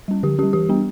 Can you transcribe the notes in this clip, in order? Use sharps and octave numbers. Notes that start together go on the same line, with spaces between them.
G3 C#4
D3 G4
G3 C#4 G4
E3 G4
G3 B3 D4